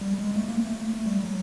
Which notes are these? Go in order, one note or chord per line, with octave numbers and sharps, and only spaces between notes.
G3
G#3
A3
A#3
A3
G3
F#3